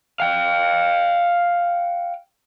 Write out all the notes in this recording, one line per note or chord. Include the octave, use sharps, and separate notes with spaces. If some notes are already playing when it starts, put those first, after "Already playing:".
F5 G5